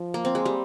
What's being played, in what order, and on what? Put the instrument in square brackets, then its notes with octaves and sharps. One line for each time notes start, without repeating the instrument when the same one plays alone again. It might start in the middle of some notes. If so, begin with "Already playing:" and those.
Already playing: [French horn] F3
[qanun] A#3
C4
G#3
G3